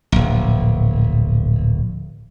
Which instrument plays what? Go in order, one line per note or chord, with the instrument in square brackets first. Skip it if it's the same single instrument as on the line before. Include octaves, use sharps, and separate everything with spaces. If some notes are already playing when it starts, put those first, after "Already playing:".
[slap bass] D1 A#1